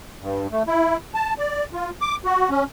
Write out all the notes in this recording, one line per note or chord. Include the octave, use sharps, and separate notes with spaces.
G2
A3
E4
A5
D5
F4
D6
F#4
C#4